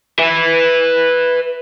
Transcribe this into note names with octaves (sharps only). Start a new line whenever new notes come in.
B4 E5